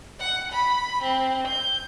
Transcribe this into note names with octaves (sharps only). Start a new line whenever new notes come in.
F#5
B5
C4
G6